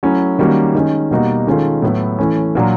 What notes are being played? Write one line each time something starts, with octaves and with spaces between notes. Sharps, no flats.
F#3 A3 C#4 E4
D#3 G3 A#3 C#4 F#4
D#3 G#3 C#4
B2 G3 A#3 D#4 F#4
D#3 G#3 C#4 F4 A4
A2 F#3 B3 E4
E3 A3 C#4
A#2 F#3 A#3 D4